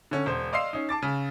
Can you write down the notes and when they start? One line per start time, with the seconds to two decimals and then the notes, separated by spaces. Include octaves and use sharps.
0.11 D3 C#4
0.26 E1 C5
0.53 D5 D#5 F5 C6 E6 C7
0.73 C#4 D#4
0.89 A5 D6 A6
1.02 C#3